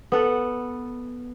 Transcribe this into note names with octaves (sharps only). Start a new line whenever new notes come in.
B3 A4 F#5